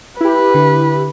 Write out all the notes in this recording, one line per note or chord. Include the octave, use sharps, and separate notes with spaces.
E4 G4 B4
D3